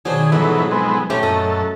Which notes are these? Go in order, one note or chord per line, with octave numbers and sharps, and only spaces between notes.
B2 D#3 F#3 D4 G#4 C5
B1 F2 G#2 E3 F#3 B3 G#4
G#3 B3 C4
A#2 A3 C#4 G4 A#5
F#2 A4 D#5